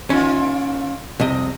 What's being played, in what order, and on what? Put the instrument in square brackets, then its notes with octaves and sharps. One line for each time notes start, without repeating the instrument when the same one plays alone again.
[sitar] D3 A#3 F4 [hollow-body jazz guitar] C#4
[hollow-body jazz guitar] C2 F2 C3 [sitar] D#5